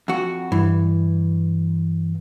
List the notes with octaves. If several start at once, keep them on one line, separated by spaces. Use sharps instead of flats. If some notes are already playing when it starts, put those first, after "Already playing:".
F2 F#4
G2 E3